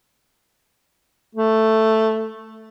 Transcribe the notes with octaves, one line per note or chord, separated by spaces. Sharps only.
A3